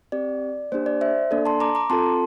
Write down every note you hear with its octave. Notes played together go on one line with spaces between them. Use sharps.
C4 G4 D5
A#3 D4 G4 C5
D5
C5 E5
A#3 D4 A4 D5
A5 C6
A#5 D6
A#5 D6
C4 F4 A4 A5 C6